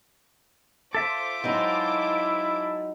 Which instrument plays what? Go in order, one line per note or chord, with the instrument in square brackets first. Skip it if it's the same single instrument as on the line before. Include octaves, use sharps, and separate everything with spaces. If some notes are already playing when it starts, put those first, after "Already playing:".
[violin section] F4 C5 D6 [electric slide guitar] A4 E5
[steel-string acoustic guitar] F#3 G#3 D#4 [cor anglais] E4